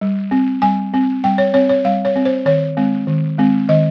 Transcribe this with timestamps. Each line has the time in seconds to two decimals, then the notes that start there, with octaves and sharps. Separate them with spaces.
0.01 G3
0.31 C4
0.62 G3 G#5
0.94 C4
1.24 G3 G5
1.38 C#5
1.54 C4 C#5
1.69 C#5
1.84 G3 F5
2.05 C#5
2.16 C4
2.25 C5
2.45 D#3 C#5
2.77 G#3 C4
3.07 D#3
3.38 G#3 C4
3.69 D#3 D#5